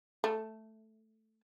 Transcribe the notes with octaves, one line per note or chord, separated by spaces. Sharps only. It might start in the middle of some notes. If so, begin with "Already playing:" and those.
A3